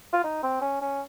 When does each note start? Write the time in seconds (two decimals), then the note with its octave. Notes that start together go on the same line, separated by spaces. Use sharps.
0.13 F4
0.24 D#4
0.43 C4
0.61 C#4
0.81 C#4